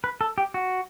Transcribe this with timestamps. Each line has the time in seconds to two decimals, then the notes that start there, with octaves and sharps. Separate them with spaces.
0.04 B4
0.21 A4
0.38 G4
0.54 F#4